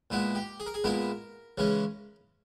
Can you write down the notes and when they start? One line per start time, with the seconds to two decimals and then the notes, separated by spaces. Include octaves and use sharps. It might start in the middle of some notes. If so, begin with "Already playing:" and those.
0.10 A#2 G#3 B3 E4
0.35 G4
0.60 G#4
0.66 A#4
0.74 G#4
0.84 A#2 G#3 B3 E4 A#4
1.58 C#3 E3 G#3 C#4